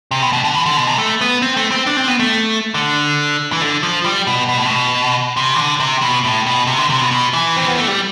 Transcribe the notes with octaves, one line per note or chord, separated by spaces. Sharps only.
C3
B2
B2
D3
E3
D3
B2
C3
A3
B3
C4
A3
C4
D4
C4
B3
A3
D3
E3
D3
F3
G3
B2
B2
A2
B2
C3
E3
D3
C3
B2
A2
B2
C3
D3
C3
B2
B2
E3
C4
B3
A3
G3